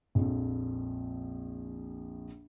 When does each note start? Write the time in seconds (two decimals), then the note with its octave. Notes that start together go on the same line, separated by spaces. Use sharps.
0.15 A#1 F2